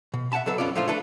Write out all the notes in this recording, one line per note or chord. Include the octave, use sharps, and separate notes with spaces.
B2
E5 F#5 G5 A5 B5
B1 F#3 A4 B4
C2 F2 B3 C#4 F4 D5
A#2 F3 A3 D4 F4
A3 D4 A4 B4